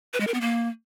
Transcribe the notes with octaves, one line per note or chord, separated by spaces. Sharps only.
B4
G#3
A#4
B3
A#3